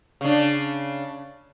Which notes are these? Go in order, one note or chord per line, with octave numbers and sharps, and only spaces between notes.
C#3 D4